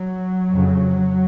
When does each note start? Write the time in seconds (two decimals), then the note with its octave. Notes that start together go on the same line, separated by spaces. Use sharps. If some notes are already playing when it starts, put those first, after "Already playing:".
Already playing: F#3
0.51 F2 C#3